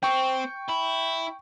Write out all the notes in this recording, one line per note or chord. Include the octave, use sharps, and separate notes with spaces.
C4 G5 C#6
E4